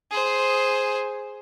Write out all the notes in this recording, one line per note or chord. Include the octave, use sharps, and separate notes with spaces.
G#4 C5